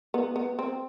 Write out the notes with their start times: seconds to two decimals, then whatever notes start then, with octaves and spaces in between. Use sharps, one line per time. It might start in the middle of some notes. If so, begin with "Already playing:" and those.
0.14 B3
0.36 B3
0.59 C4